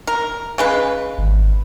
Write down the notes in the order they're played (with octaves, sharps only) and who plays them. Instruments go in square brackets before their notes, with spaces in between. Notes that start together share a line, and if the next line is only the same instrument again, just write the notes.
[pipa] A#4
C#3 G#3 B4
[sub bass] G#1